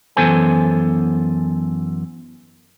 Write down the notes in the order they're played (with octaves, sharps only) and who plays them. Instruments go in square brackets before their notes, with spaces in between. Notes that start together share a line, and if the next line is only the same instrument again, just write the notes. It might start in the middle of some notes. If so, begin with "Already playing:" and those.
[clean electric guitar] F#2 E3 B3 A4 C5 G#5